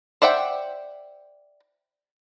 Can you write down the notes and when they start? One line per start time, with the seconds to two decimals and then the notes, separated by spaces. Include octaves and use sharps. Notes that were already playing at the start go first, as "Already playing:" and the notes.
0.22 C5 D5 E5 F#5 G5